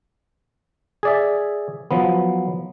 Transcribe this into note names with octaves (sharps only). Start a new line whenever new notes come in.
G#4 D5 E5
F3 F#3 B3